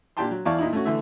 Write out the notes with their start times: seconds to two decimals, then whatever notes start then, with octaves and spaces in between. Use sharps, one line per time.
0.17 A#2 D4 G4 G5 A5 C6
0.31 F#3
0.45 E2 E4 D5 F5 A5 C#6
0.58 A#2 D#4 E4
0.73 A3 C#4 F#4
0.85 D3 E3 A3 E5